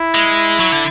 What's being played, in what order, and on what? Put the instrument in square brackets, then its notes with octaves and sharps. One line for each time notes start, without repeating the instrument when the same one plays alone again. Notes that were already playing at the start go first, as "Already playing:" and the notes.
Already playing: [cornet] E4
[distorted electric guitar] G#3
F#3
D3